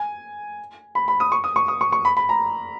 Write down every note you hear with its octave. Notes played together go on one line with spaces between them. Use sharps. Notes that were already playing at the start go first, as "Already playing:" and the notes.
Already playing: G#5
B5
B5
D#6
C#6
D#6
C#6
D#6
C#6
C#6
B5
B5
A#5